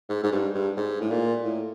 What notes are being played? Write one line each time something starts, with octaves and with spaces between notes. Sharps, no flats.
G#2
G#2
G2
G2
G#2
A2
A#2
A2